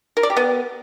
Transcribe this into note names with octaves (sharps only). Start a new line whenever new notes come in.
A#4
D5
G4
B3